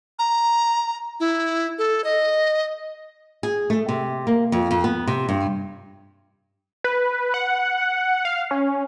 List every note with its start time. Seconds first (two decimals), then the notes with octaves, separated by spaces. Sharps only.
0.19 A#5
1.20 E4
1.78 A4
2.04 D#5
3.43 G#4
3.70 A3
3.89 C3
4.27 A#3
4.52 F2
4.71 F2
4.84 B3
5.07 C3
5.29 G2
6.84 B4
7.34 F#5
8.25 F5
8.51 C#4